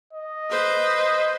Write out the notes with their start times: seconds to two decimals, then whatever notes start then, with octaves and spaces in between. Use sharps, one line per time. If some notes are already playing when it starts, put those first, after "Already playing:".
0.13 D#5
0.51 B4 C5